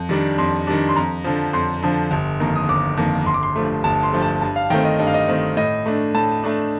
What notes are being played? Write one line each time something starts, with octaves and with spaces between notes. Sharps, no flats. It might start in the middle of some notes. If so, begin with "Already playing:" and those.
Already playing: F2
D#3 G3 D4
F2 C6
D#3 G3 D4
C6
F2 A#5
D3 F3
F2 C6
D3 F3
G1
F2 D#3 A#3
D#6
G1 D6
F2 D#3 A#3
G1 C6
D6
C6
G2 F3 A3
G1 A5
C6
G2 F3 A3
A5
G2 A5
F5
D#3 A3 C4 G5
D#5
G2 D#5
F5
D#5
D#3 A3 C4
A2 D#5
A3 D4
A2 A5
A3 D4